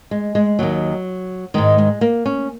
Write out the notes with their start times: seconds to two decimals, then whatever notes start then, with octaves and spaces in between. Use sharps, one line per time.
0.11 G#3
0.35 G#3
0.59 D#2 D#3 F#3
1.54 G#2 D#3 G#3
1.78 G#3
2.01 A#3
2.26 C#4